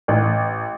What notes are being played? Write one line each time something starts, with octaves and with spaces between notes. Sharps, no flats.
A1